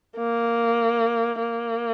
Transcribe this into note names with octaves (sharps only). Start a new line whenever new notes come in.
A#3
A#3